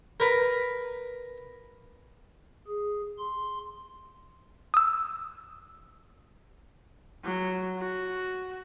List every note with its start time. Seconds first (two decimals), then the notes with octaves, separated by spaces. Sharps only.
0.20 A#4 B4
2.68 G#4
3.18 C6
4.74 D#6 E6
7.24 F#3
7.78 F#4